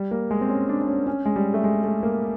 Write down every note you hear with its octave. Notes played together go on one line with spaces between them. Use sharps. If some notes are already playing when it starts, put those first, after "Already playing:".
Already playing: G3
A#3
G#3
C4
C#4
D4
D4
C#4
C#4
G#3
G3
A3
G#3
A3
A#3